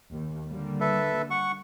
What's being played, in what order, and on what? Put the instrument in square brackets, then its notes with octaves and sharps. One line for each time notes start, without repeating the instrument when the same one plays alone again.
[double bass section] D#2
D3 G3 A#3
[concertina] A4 B4 E5
F#5 C#6